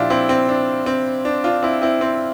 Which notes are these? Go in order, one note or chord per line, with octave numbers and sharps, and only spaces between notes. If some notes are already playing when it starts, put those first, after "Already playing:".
Already playing: A#2 F3 D4 E4 F4 G4
C4 E4
C4
D4
C4
D4
D4 F4
C4 E4
C4 E4
C4